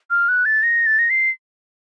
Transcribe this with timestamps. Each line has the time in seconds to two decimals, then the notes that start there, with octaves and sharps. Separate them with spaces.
0.10 F6
0.28 F#6
0.45 A6
0.63 A#6
0.86 A6
0.99 A#6
1.10 C7